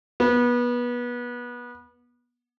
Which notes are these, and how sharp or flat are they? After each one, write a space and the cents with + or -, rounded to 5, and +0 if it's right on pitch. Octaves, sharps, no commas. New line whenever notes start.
B3 -25